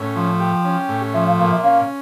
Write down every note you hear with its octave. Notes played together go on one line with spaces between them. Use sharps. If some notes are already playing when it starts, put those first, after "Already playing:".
Already playing: A2 C#4
F3
G4
C#4
A2
F3 E5
F5
A#2 F5
E5
C#4 F5